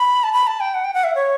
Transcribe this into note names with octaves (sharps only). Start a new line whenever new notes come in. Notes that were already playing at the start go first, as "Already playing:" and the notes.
Already playing: B5
A5
B5
A5
G5
F#5
G5
F#5
E5
C#5